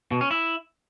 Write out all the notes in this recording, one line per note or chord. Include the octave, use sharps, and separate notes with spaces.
B2
C#4
E4